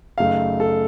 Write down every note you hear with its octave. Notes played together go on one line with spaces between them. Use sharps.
F#2 C#3 A3 D#4 F5
A4